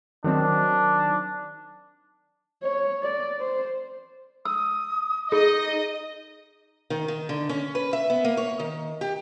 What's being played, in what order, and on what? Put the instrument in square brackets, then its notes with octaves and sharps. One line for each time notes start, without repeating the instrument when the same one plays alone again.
[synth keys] D#3 F#3 C4 [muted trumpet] D4
[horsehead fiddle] C#5
D5
C5
[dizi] D#6 [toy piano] E6
[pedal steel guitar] D#4 [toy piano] G#4 [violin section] D#5
[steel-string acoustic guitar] D#3
D#3
D3
C#4
B4
E5
B3
A#3
C#5
D#3
G4